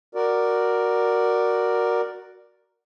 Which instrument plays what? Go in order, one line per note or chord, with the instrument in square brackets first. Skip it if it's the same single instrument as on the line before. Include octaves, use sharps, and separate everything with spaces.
[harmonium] F#4 A#4 D5